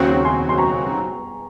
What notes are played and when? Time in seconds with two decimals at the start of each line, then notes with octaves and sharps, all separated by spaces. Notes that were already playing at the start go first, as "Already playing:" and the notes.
Already playing: D#2 C#3 F#3 C4 F#4 C#6
0.25 G#5 C6
0.49 C6
0.58 A#5 C#6